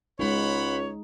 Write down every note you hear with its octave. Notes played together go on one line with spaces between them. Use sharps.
C#2 G#3 D#4 C5 C#5 F#5 B5